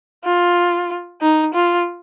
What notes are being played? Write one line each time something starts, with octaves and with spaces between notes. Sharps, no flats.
F4
D#4
F4